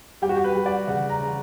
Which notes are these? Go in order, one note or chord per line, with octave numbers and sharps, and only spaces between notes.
G3 G4
F#4
G4
B4
G3
D5
C#3 F#5
A#5
C#3